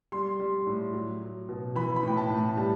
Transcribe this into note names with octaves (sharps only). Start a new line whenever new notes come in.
G3 C6
G3
A2
F#3
F#3
B2
E3 B5
B5
A2 G5
A5
A2
A5
G3 A5